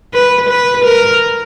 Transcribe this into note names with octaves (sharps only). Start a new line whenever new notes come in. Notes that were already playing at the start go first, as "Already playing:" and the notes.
B4
B4
A#4